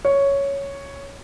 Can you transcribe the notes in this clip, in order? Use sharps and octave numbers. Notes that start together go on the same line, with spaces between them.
C#5